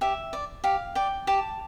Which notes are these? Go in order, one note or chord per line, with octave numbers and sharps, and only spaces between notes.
G4 E5
D5
G4 F5
D5 G5
G4 A5